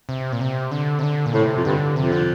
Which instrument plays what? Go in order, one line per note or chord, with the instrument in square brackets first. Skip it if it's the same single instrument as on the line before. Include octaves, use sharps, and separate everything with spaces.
[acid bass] C3
A#2
C3
D3
C3
D3
A#2
[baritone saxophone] A2 [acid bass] C3
[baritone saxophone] F2
[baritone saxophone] G2 [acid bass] D3
[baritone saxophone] F2 [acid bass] C3
[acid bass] D3